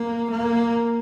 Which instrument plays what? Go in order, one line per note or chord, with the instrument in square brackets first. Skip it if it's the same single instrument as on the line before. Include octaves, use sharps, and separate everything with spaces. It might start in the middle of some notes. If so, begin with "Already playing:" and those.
Already playing: [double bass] A#3
A#3